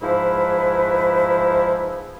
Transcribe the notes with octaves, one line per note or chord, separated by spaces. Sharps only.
G#2 F3 E4 B4